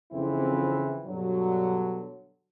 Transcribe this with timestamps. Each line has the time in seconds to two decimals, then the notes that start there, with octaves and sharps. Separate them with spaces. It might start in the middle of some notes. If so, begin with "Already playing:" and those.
0.12 F2 C#3 E3 F3 C4 E4
1.07 G2 B2 D3 F#3